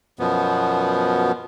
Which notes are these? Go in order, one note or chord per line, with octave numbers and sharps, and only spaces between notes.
F#2 B2 F3 B3